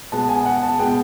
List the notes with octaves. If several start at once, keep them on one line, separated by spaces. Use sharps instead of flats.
B2 G#3 B3 A5
G#5
F#5
A5
B2 G#3 B3 G5